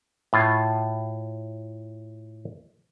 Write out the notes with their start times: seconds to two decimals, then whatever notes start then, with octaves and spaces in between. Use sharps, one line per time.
0.33 A2 F4